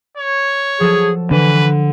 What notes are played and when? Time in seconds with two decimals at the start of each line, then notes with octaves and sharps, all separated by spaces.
0.17 C#5
0.80 F3 F#3 G#4 A4
1.31 D3 E3 B4